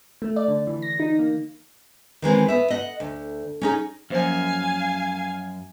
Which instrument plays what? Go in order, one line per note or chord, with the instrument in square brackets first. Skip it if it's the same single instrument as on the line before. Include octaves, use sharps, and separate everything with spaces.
[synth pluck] A3
D5
D3
E3
A#6
D#4
A#3
[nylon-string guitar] D#3 E3 G#3 C4
B3 E5
D#5 F#5
D2
C#4 D#4 G#4
[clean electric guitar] F#2 [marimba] F3 A#3 C5 [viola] F5 G#5